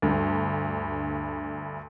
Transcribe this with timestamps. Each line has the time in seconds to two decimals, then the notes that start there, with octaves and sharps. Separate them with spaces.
0.02 D2 G2